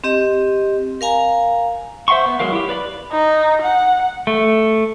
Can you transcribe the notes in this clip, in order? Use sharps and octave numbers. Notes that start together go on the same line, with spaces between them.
C4 G4 D#5
A#4 F5 G#5 A#5
C5 E5 F#5 C6 C#6
B3
F#3 G#3 A#4 F5
E4 G4
B4 D5 B5
D#4
F#5
A3